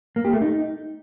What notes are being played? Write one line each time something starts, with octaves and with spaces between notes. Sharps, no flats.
A#3
G4
A3
D#4